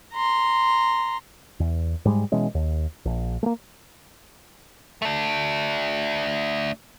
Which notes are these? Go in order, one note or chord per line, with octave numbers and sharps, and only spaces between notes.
A#5 C6
E2
G#2 G3 G#3
B2 E3 G#3 C#4
D#2
A#1
A3 A#3
A3 D4